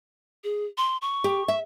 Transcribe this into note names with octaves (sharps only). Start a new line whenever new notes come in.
G#4
C6
C#6
G4
E5